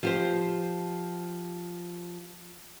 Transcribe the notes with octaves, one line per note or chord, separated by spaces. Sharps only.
F3 G4 C5